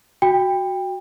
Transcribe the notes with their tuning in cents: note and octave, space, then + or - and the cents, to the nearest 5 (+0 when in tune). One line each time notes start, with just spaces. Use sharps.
F#4 +0 G5 +20